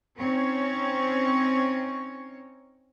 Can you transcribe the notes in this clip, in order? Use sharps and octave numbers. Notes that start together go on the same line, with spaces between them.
C4 C#4 D#4 C#5